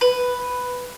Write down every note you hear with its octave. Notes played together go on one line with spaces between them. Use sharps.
B4